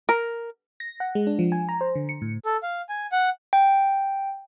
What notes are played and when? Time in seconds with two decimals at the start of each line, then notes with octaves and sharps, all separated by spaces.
0.09 A#4
0.80 A#6
1.00 F#5
1.15 G#3
1.27 D4
1.39 F3
1.52 G#5
1.69 A#5
1.81 C5
1.95 D3
2.09 C#7
2.22 A2
2.44 A4
2.63 F5
2.89 G#5
3.12 F#5
3.53 G5